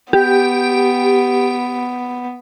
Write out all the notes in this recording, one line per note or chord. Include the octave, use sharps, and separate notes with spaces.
B3 G4